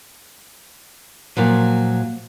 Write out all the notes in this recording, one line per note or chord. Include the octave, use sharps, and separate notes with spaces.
A#2 F3 F#3 A#3